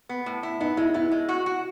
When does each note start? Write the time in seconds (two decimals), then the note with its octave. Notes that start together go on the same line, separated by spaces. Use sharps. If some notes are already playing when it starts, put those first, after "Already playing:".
0.09 B3
0.26 A2
0.43 E4
0.60 B3 D#4
0.77 G#3 E4
0.94 B3 E4
1.11 G#3
1.29 F#4
1.46 F#4